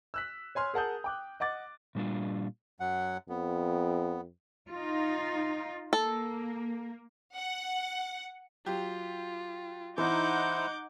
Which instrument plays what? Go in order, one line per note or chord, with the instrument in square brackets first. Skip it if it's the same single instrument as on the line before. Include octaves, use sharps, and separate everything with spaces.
[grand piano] E6 F#6 B6
C#5 G#5 C6 F6
G#4 A#4 F#5 A5 D#6 G6
G5 D6 F#6
D#5 F#5 D6 A6
[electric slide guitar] A#2 G3 D4 F4
[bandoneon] F#2 F#3 F#5
[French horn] F2 [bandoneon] B3
[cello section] D#4 F4
[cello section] A#3 [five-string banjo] A4
[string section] F#5
[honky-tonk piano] F#3 G4 [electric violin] F4
[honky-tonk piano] E3 [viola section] D#4 F#5 [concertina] E4 C5 [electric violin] D6 G6